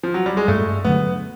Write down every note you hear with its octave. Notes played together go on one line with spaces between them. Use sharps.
F3
F#3
G3
G#3
G2 A3
D3 F#3 A3 B3